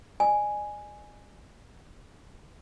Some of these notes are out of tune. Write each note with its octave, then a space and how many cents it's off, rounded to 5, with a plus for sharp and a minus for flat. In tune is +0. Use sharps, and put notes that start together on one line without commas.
D5 +45 G#5 +0